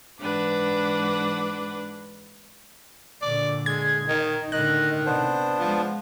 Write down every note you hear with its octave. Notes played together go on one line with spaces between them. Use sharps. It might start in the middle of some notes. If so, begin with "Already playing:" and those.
G#2 E3 D4 B4 F#5 D6
A#2 D3 D5
G#3 G#6
D#3 D#4
A2 D3 D#3 D#5 F#6
C3 B3 D4 C5
F3 G#3